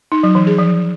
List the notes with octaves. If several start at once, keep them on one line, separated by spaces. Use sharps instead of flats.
D#4
F#3
E3
G#4
F3